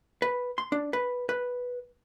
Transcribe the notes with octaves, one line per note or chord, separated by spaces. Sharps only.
B4
C6
D4
B4
B4